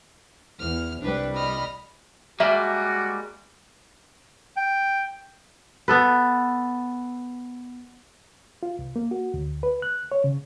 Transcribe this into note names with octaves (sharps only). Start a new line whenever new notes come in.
E2 F6
C2 G3 D4 B4
D#5 B5 F6
G3 G#3 A#3 F#4 E5
G5
B3 A4 B4
F4
C2
A#3
F#4
D2
B4
F#6
C#5
C#3